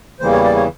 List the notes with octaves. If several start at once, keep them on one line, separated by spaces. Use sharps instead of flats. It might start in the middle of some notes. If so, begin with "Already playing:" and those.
E2 C#3 E3 G3 A#3 C5
C#5
D5
C#5